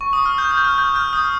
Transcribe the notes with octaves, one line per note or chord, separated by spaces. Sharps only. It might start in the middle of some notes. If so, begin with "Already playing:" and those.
C#6
D#6
F6
G6
G6
F6
G6
F6
D#6